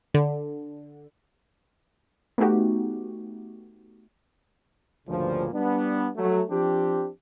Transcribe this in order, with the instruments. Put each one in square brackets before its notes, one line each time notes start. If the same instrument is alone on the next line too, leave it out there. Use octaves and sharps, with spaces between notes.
[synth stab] D3
[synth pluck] A3 B3 D#4 F#4 G4
[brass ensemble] D2 G2 A#2 C#3 F3
G3 B3 D4
F#3 A3
F3 C4 D4 G4